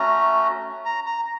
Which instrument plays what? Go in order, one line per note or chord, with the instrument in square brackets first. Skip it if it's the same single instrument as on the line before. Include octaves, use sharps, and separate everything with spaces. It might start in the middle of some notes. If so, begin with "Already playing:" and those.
Already playing: [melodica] A3 C#4 F#4 A#5
A#5
A#5